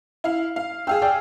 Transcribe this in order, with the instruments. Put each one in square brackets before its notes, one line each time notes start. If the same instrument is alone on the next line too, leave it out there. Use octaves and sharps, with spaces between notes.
[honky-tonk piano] E4 F5
F5
[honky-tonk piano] G#4 F5 E6 [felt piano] G5
[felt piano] D5 G5